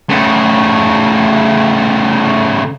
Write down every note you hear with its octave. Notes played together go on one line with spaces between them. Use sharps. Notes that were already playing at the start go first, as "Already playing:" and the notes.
C#3 A3